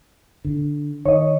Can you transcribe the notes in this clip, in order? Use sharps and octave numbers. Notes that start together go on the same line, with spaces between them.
D3
D#3 C#5 D#5